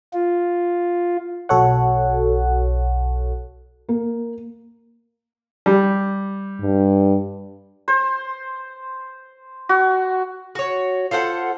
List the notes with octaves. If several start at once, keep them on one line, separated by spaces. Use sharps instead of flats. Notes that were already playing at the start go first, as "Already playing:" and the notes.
F4
B1 F#4 A4 C#5 F#5
A#3
G3
G2
C5
F#4
F#4 C#5
F4 A4 C5 F#5